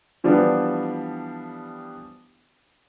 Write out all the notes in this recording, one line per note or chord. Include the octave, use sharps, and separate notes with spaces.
E3 F3 G3 B3 D4